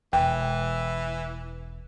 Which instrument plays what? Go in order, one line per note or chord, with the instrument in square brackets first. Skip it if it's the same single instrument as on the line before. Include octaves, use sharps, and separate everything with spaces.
[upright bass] E1 [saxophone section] E3 [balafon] G5